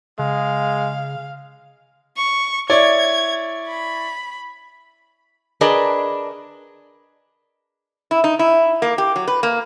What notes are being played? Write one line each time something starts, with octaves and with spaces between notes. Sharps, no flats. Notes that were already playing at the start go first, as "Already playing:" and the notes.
C#3 G#3 F5
C#6
E4 C#5 D5 G#6
B5
D4 G#4 A#4 B4 D5 D#5
E4
D#4
E4
A#3
G4
F#3
B4
A#3